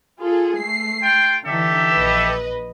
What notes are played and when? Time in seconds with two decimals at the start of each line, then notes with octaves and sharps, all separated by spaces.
0.21 F4 G#4 A4
0.58 A3 C7
1.02 F4 G5
1.45 D3 E3 D#4 G4 A4 E5
1.95 A#1 B4 D#5